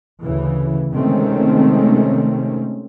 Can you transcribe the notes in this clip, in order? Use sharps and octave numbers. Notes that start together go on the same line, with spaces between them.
D2 C#3 E3
C3 D#3 G#3 A3 C4 C#4